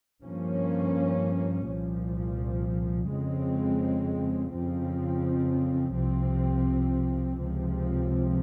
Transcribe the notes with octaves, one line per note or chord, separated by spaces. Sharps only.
G2 F3 A#3 C#4
C2 A#2 F3
F2 C#3 G#3 C4
F2 C#3 F3 C4
C2 C3 F3 C4
C#2 C3 F3 C4